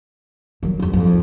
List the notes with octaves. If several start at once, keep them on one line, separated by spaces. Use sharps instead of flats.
D#3 F#3
G1 F2
F2 G#2